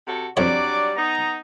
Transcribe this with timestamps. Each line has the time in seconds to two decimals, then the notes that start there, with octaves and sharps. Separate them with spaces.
0.06 C3 F#4 A4
0.37 F2 F#3 G3 D4 C#5 D5 D6
0.97 B3 D#4 A#5